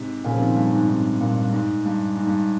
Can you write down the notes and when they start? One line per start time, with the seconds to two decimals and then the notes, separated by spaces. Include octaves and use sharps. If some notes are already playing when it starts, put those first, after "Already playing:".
Already playing: G#2 C3
0.24 A#2 C#3
0.34 F3
0.40 C3 D#3
0.56 G2
0.73 G#2
0.89 G#2 C3
1.20 G2 A#2
1.45 G2
1.52 G#2
1.86 G2
2.17 G#2
2.27 G2